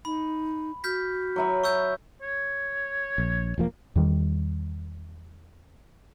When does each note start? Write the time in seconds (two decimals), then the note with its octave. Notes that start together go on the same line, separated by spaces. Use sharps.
0.05 D#4 B5
0.84 F#4 F6 G6 B6
1.36 F#3 E5 B5
1.64 C#6 E6 G6
2.22 C#5
3.18 A#1
3.58 E1 F3 A#3
3.96 E2 D#3 G3